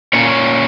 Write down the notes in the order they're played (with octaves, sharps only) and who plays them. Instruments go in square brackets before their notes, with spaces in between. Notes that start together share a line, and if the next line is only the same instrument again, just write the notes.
[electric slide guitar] A#2 A#3 C#4 C#5